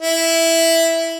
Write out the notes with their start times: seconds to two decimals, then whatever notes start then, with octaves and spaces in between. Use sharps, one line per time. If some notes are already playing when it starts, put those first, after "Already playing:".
0.01 E4